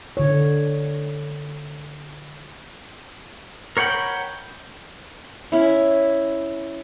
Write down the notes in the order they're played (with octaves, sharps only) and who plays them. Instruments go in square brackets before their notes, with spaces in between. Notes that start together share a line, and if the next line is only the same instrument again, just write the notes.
[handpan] D3 C#5
[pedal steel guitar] A#4 C#5 F#5 G5 B5
[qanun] C#4 E4